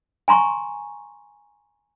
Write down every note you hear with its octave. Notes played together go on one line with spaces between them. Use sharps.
G#5 A#5 C6 C#6